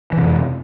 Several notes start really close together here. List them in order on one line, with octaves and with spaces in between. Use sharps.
E3 C3 F2